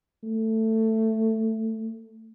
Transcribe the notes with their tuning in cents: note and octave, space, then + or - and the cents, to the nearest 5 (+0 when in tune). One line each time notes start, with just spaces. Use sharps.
A3 +15